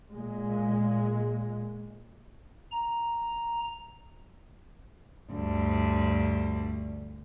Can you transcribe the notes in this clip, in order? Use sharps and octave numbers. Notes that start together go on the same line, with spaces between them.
A#2 G#3
A#5
D2 G2